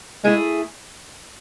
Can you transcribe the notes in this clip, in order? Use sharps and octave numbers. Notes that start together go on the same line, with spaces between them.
G#3 A3 E4 G#4